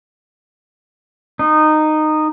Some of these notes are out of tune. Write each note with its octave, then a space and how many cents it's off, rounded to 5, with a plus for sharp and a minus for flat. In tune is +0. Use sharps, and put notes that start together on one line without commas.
D#4 -15